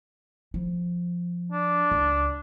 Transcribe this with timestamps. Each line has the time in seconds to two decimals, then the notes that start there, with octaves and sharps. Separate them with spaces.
0.54 F3
1.52 D4
1.92 C#2